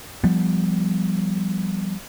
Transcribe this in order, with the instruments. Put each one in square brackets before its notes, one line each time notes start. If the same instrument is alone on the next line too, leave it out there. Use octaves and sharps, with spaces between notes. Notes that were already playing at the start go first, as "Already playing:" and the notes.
[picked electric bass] F3 G3 B3